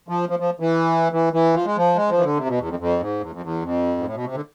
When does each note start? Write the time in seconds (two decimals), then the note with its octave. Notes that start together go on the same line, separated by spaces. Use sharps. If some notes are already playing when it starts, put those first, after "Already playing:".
0.08 F3
0.29 F3
0.39 F3
0.60 E3
1.12 E3
1.33 E3
1.54 F3
1.65 G#3
1.77 F3
1.96 G#3
2.10 F3
2.18 E3
2.23 D3
2.37 C3
2.48 B2
2.58 E2
2.69 F2
2.79 F2
3.00 G#2
3.21 E2
3.31 F2
3.42 E2
3.62 F2
3.97 G#2
4.04 A2
4.14 B2
4.25 C3
4.35 D3